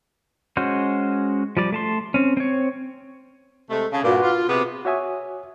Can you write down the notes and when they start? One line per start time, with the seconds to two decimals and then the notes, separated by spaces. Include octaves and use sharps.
0.57 G#3 C#4 F#4 C5
1.57 F3 G3 D5
1.72 A3 A5 C6
2.14 C4 C#4
2.37 C4 C#5
3.69 C3 G#3 A3
3.91 C#3 F5 A5
4.03 G2 A#2 F#4 B4 D6
4.22 F4
4.48 C3 B3 G#4 B4 D6
4.85 F#4 C#5 E5 G#5 D#6